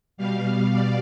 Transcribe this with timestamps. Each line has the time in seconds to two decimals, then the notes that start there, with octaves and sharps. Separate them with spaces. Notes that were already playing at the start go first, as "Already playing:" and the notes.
0.17 B2 G3 F5
0.71 D5